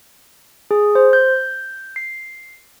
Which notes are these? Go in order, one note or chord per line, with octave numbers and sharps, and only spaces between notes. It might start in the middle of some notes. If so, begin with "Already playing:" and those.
G#4
C5
G6
C7